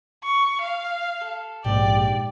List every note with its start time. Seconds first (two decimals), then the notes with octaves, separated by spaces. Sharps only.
0.24 C#6
0.61 F5
1.21 A4
1.64 A#1 G#2 G4 D5